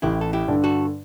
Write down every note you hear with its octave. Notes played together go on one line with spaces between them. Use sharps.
A1 E4 G4
A4
E4 G4
G2 D3
F#4 A4